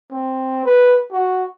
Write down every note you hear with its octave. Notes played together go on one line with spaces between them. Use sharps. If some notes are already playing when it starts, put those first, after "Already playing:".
C4
B4
F#4